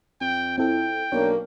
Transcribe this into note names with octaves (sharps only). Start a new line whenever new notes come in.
F2 G5
C4 E4 A4 G5
B1 A#3 D4 C#5